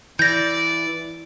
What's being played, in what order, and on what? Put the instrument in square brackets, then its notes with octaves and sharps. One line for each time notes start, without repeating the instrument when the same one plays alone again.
[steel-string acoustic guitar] E3 [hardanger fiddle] D5 [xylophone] G6 A#6